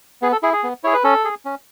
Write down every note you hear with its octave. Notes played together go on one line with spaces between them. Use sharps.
B3 G#4
A4
E4 G#4
G#4
B3
E4 G#4 C#5
B4
C#4 A4
G#4
C#4